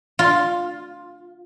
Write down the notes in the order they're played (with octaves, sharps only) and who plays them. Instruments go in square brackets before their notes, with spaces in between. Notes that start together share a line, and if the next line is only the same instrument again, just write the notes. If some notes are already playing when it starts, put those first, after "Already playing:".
[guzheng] F4